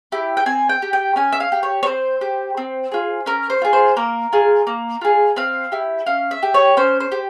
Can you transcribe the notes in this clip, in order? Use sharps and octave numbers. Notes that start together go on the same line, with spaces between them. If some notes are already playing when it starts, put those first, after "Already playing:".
E4 G4
G5
C4 G#5
G5
G4
G5
C#4 G#5
E5
F5
G4
C#5
C#5
C4 C5
G4
C4
F4 G#4
C#4 A#4
C5
F4 G#4
C5
A#3 A#4
F4 G#4
A#3
F4 G#4
C4 F5
E4 G4
C#4 F5
E5
G4
C#5
C#4 C5
C5
G4